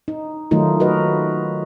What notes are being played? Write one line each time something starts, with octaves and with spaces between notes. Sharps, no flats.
D#4
D#3 F#3 A3 D#4 F4
F#4 A#4 B4 D#5